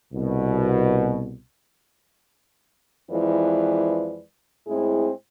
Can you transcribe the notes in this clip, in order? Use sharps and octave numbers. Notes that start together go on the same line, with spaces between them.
C2 B2
F2 E3 G#3 E4 B4 D5
A2 G#3 C4 E4 G#4